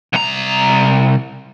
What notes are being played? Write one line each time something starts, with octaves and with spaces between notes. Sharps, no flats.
C2 A#5